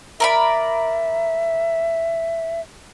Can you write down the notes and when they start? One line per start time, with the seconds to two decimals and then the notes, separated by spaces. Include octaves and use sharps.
0.20 A#4 D5 E5 B5